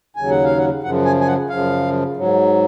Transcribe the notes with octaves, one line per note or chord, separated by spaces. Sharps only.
D#2 C#3 F#3 G#5
F#5
F5
F#5
F#2 C#3 F3 F#5
G#5
G#5
F#5
F#2 C#3 F3 F5
G#2 F#3